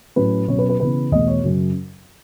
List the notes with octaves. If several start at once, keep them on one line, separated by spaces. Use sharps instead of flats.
A2 F#3 C#4 B4
B2 F#3 C#4 C#5
B4
B4
C#3 E3 B3 B4
E2 B2 A3 D#5
C#5
F#2 C#3 F#3 C#4